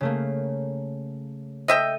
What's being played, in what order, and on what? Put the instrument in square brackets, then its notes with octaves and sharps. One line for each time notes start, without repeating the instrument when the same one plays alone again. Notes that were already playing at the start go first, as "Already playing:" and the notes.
[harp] C#3 A3 A#3
[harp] A4 D#7 [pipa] D#5 E5 G5